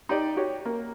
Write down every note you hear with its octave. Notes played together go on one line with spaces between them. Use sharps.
D#4 G4 D5
F#4 G4 C#5
A#3